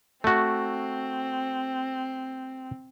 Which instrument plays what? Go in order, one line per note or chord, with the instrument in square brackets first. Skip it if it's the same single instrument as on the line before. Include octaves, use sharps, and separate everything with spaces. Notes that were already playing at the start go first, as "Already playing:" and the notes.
[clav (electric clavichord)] A3 F#4 [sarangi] C4